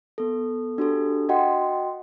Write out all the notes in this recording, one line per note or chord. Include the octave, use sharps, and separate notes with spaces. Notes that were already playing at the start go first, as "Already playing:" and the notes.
B3 A4
D4 F#4 G4 A4
F#4 D#5 F#5 G5 C6